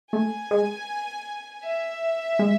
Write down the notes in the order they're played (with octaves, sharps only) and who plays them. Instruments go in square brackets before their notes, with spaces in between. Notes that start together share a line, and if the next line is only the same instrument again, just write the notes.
[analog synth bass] A3 [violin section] G#5
[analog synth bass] G#3
[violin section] E5
[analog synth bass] G#3